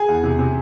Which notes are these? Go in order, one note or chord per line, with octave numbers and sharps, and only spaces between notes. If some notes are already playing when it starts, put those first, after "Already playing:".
Already playing: G#4 G#5
E2
C3
C3